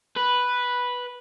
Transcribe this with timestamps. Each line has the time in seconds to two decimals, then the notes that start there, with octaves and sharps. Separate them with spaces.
0.17 B4